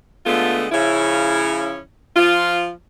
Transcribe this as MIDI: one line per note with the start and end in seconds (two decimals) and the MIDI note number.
0.26 0.67 50
0.26 0.67 56
0.26 0.67 57
0.26 0.67 59
0.26 0.67 65
0.72 1.78 49
0.72 1.78 53
0.72 1.78 61
0.72 1.78 64
2.16 2.70 53
2.16 2.70 65